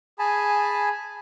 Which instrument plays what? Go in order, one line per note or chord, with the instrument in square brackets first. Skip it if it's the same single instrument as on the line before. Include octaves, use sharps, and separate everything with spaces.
[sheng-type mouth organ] G#4 G#5 A5 B5